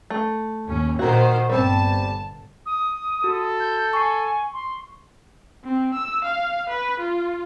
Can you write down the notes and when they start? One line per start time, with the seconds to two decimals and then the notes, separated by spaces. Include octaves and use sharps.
0.10 A3
0.66 D#2 C#4
0.99 A#2 D#3 A#3 F#4 C5
1.49 G1 G3 C4 A5
2.66 D#6
3.24 F#4 A4
3.60 G6
3.93 G#5 C#6 C7
4.53 C6
5.64 C4
5.94 E6
6.24 F5
6.69 B4
6.99 F4